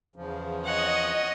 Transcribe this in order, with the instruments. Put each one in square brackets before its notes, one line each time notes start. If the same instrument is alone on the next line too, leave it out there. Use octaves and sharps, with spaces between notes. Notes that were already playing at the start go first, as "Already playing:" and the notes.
[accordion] E2 C#3 F3
[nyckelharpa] C#5 F#5 [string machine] D#5